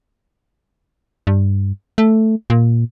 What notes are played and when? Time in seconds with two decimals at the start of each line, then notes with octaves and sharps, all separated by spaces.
1.27 G2
1.98 A3
2.50 A#2